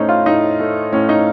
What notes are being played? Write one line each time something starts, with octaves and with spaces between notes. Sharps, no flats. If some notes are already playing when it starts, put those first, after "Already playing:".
Already playing: A2 A3 C#4 D#4 C5
F4
A2 D#4
A3
A2 C#4
D#4